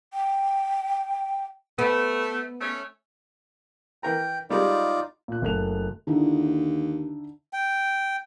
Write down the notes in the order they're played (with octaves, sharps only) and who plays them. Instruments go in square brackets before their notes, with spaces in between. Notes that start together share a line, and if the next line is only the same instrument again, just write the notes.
[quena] G5
[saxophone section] A3 [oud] B3
[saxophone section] A3 C#4
[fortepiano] E3 A#4 A#5 [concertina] G5
[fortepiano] G3 G#3 [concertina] D#4 F4 D5
[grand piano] A#2 F#6
F#1 A3 F#6 F7
[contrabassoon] D#2 [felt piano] D3 D#4 E4
[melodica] G5